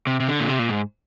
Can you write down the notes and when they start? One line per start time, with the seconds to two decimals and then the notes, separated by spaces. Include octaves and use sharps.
0.07 C3
0.20 C3
0.28 D3
0.40 A#2
0.48 C3
0.59 A#2
0.69 G#2